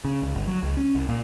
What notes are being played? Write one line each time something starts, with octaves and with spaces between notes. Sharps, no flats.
C#3
C#2
G1
F#3
C#2
C#4
C2
A#2